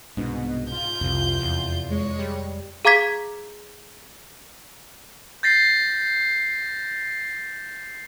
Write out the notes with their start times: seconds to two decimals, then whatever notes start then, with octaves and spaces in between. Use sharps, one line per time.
0.17 C2 G#2 B2 G#3 D4
0.71 F4 G6
1.01 C2 F2 C3
1.40 E2
1.90 G#3 C#5
2.19 G3
2.85 G#4 F5 A#5 D6 G#6 B6
5.43 G6 A6 A#6 C7